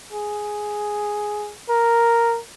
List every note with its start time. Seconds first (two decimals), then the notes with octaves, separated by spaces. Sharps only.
0.12 G#4
1.69 A#4